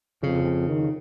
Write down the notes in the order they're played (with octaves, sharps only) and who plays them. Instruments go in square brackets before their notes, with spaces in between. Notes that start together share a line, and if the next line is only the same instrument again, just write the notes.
[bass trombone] F2 [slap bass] C#3
[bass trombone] D#3